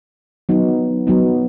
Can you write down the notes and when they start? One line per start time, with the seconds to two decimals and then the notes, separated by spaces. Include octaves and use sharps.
0.49 F#3 B3 D#4
1.07 F#3 B3 D#4